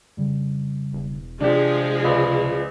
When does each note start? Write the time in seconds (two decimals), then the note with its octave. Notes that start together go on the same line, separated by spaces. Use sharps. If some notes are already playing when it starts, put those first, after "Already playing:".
0.17 F2 C#3 G3
0.93 E1
1.40 C3 E3 F3 G#3 D4 G4 G#4
2.04 C#2 B4 D5